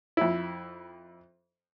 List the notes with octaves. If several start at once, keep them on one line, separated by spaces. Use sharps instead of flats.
F2 E4